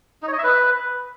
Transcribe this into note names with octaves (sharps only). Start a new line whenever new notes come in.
D#4
C#5
D#5
E5
B4